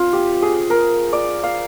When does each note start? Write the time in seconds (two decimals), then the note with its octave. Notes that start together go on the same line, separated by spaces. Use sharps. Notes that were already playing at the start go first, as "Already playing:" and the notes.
Already playing: C4 F4
0.13 G4
0.42 G#4
0.70 A#4
1.13 D5
1.43 F5